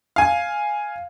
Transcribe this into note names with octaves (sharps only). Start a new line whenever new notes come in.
F5 G#5